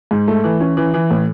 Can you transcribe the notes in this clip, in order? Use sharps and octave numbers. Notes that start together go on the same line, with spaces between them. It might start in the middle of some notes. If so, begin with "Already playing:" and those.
G#2
A3
E3
C#4
E3
E3
A2